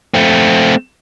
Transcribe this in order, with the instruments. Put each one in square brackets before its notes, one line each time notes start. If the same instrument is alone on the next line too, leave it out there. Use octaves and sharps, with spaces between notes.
[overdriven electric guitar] A3 C4